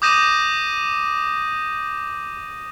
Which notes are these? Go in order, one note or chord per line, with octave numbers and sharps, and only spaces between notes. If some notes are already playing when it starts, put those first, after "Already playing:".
D6 D#6 G6 A#6 D#7 E7